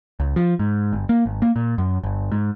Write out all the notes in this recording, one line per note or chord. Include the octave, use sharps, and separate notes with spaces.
C#2
F3
G#2
G1
A#3
G#1
A#3
A#2
F#2
G1
G#2